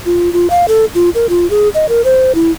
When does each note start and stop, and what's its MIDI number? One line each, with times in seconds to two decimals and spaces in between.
0.06 0.32 65
0.33 0.50 65
0.50 0.66 77
0.68 0.85 69
0.95 1.10 65
1.15 1.26 70
1.29 1.49 65
1.50 1.69 68
1.75 1.89 75
1.89 2.02 70
2.05 2.35 72
2.35 2.51 64